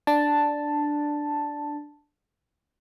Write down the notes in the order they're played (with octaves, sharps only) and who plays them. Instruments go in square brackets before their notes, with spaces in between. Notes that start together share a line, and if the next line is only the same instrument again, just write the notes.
[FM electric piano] D4 A5